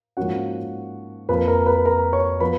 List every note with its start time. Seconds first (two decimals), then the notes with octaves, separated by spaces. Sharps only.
0.17 G#2 F3 A#3 C#4 F#4 F#5
1.29 F2 F3 A#3 B4 B5
1.48 A#4 A#5
1.66 B4 B5
1.85 A#4 A#5
2.13 C#5 C#6
2.40 F3 B3 B4 B5